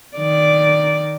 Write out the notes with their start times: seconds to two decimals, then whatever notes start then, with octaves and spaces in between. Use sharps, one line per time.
0.17 D#3 D5